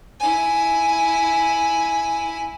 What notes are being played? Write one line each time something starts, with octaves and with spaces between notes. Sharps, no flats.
E4 G#5